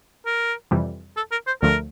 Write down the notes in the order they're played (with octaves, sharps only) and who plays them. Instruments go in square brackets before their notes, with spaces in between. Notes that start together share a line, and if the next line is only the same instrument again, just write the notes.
[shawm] A#4
[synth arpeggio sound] F2 C3 E3 G3
[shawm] A4
A#4
C5
[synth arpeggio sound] D2 D3 F3 A3 [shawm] A#4